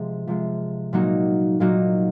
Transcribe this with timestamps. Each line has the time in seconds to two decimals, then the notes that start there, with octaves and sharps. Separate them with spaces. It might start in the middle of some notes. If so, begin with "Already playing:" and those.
Already playing: C3 F3 G#3
0.27 C3 F3 G#3
0.93 A#2 F#3 A#3 D#4 F#4
1.60 A#2 F#3 A#3 D#4 F#4